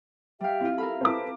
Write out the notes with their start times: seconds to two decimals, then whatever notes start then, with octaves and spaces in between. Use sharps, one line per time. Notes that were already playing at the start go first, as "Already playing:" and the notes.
0.41 G3 G4 E5 F5 G5
0.61 C4 E4 F4
0.78 A4 A#4 F5 B5
1.01 C4 E4 A4 B4 A5 D6